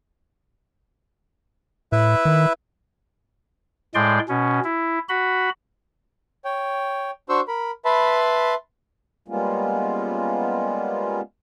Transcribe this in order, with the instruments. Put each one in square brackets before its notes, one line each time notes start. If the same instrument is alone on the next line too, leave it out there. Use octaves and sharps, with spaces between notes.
[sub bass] A2 [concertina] E4 B4 E5
[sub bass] D#3
[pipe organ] A2 G#3 D5 G5 C6
B2 C#4
E4
F#4 B5
[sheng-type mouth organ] C#5 G5
D4 F#4 C5 C6 C#6 E6
A#4 B5
B4 E5 A5 B5 C6
[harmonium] G3 G#3 A#3 B3 C#4 F4